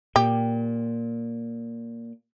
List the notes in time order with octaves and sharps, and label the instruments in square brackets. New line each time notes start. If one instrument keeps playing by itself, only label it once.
[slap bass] A#2 [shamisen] G4